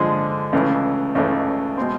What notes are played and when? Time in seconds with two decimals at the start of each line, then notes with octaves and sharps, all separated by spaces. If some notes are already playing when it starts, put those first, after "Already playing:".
Already playing: D3 F3 G#3
0.53 C#2 C#3 E3 A3
1.15 C#2 C#3 E3 A3
1.77 B2 G#3 C4